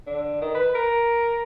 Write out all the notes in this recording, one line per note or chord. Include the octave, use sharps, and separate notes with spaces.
D3
D#3
B4
A#4